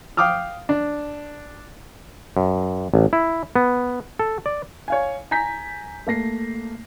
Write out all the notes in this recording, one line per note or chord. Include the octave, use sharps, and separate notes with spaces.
F5 G5 D6 D#6 F6
D4
F#2
A1
E4
B3
A4
D5
C#5 F5 G#5
G#5 A#5 G6 B6
A3 A#3 A#6 C7